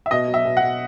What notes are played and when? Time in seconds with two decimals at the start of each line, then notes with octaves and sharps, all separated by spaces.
0.06 E5
0.11 B2 D#5
0.28 F#3
0.34 E5
0.45 B2
0.57 B2 F#5